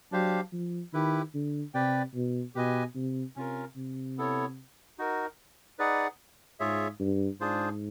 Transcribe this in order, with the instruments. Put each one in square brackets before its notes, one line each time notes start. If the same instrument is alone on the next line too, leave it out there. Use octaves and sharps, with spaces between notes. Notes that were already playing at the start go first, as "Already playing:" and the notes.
[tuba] F#3 [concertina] D4 G4 C5 F5
[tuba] F3
[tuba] D#3 [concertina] E4 G4 B4
[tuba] D3
[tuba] C3 [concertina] G4 B4 D5 G5
[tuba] B2
[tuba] B2 [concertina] G4 B4 D#5 G#5
[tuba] C3
[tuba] C3 [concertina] C#4 F4 A#4
[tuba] C3
[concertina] B3 E4 A4 C#5
D#4 F#4 A#4
D#4 G#4 B4 D5 F#5
[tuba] G#2 [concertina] F4 G#4 C#5 E5
[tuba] G2
[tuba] G#2 [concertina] D4 F4 G#4 C5